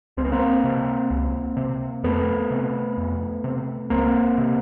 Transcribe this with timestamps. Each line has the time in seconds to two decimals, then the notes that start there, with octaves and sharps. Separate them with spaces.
0.17 C#2 C4
0.25 B3
0.32 A#3 C4
0.64 C3
1.10 C#2
1.57 C3
2.03 F2 A3 B3
2.50 C3
2.97 F2
3.44 C3
3.90 C#2 A#3 C4
4.38 C3